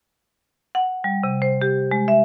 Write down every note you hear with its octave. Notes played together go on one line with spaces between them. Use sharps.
F#5
G3
C3
C5
G4
G#3
E5